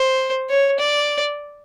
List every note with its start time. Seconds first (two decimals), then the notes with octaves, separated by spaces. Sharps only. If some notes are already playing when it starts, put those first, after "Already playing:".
Already playing: C5
0.50 C#5
0.79 D5